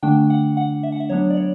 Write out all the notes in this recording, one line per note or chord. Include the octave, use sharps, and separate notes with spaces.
D3 A3 D4 G5
F#5
F#5
E5
F#5
E5
F#3 B3 D4 C#5
D5
C#5